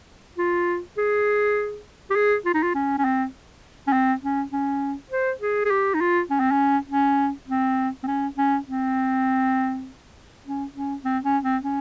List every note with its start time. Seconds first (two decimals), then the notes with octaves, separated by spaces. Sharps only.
0.38 F4
0.98 G#4
2.10 G4
2.15 G#4
2.46 F4
2.54 D#4
2.63 F4
2.75 C#4
2.98 C#4
3.05 C4
3.88 C#4
3.93 C4
4.23 C#4
4.53 C#4
5.11 C5
5.41 G#4
5.65 G#4
5.70 G4
5.95 D#4
6.01 F4
6.30 C#4
6.40 C4
6.51 C#4
6.89 C#4
7.48 C4
8.04 C4
8.07 C#4
8.38 C#4
8.67 C4
10.45 C#4
10.74 C#4
11.04 C4
11.24 C#4
11.43 C4
11.63 C#4